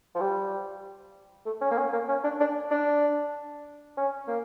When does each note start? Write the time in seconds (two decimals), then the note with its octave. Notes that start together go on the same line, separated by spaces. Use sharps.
0.15 F3
0.20 G3
1.46 A3
1.61 C#4
1.71 A#3
1.78 C#4
1.93 A#3
2.08 C#4
2.24 D4
2.40 D4
2.71 D4
3.97 C#4
4.28 A#3